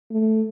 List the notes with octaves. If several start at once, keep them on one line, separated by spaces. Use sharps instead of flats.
A3